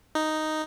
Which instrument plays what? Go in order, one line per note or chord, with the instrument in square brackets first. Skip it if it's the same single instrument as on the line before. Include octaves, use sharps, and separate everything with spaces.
[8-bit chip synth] D#4